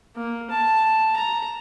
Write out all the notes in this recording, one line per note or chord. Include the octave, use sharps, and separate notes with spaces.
A#3
A5
A#5